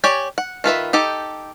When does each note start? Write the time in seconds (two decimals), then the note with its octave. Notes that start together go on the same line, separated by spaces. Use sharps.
0.04 G4 C#5 D5 G5 G#5
0.38 F#5
0.64 D#3 F4 B4 E5
0.93 D#4 G4 A4